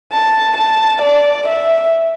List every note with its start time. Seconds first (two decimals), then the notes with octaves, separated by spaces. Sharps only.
0.12 A5
0.57 A5
1.02 D5
1.48 E5